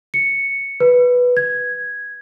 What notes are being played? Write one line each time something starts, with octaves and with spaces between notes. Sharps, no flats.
C#7
B4
G#6